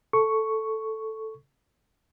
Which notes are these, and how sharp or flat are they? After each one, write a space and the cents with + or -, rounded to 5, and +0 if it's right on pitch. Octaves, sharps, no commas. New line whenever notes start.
A4 +0 C#6 +0